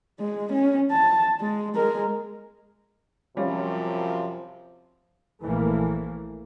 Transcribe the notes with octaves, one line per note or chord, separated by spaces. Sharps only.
G#3
C#4
A5
G#3
G#3 A#4
F#2 C3 F3 G3 C#4 F4
A#1 E3 A3 A#3